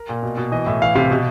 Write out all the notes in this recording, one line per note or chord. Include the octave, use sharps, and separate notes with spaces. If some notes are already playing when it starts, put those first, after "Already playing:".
Already playing: A#4
A#2
B2
B2
E3 D#5
A2 E5
E3 F5
C3 F5
B2